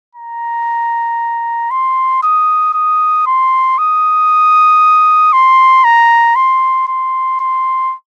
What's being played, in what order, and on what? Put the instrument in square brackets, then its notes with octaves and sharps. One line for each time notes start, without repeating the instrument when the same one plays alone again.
[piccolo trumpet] A#5
C6
D#6
D#6
C6
D#6
C6
A#5
C6
C6
C6